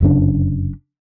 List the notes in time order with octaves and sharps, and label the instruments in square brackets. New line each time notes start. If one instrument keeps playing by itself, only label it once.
[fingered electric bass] F1 F#2 C#3 D4